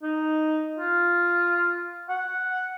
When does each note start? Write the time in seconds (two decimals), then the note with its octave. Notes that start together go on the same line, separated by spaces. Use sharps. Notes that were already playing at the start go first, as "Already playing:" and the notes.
0.03 D#4
0.79 F4
2.09 F#5